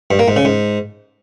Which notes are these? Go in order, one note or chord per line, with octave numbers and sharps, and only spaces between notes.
G2
A#3
G#2
C#3
G#2